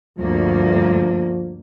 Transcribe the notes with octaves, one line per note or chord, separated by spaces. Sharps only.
D2 G2 F3 A#3